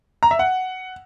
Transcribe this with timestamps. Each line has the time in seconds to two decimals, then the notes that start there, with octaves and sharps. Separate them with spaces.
0.23 A#5
0.31 E5
0.39 F#5